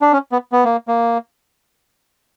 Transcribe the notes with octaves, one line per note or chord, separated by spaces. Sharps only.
D4
C#4
B3
B3
A#3
A#3